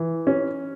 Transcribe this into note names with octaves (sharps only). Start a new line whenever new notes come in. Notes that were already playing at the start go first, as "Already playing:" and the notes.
Already playing: E3
C#4